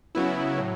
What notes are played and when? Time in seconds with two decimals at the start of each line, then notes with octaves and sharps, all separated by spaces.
0.15 C#3 F#3 B3 E4
0.58 A2 F#3